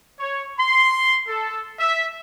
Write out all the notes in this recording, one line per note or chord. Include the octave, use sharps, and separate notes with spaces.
C#5
C6
A4
E5